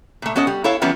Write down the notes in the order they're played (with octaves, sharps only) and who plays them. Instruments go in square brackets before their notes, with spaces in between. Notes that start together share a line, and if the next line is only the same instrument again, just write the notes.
[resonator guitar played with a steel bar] A#2 A3
B3 C#4 A4 C#5 D#5
G3
E4 A4 C#5 F5
E3 F3 G3 B3 C#4 F4